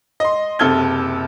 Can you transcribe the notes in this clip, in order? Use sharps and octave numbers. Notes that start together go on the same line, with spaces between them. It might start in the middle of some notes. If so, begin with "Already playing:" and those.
D#5 C6
F#1 C3 A4 F6 G#6 G7